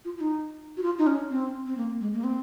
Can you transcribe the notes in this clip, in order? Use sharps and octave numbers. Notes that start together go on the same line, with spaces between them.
F4
F4
D#4
F#4
F4
D#4
C#4
C4
C4
A#3
G#3
A#3
C4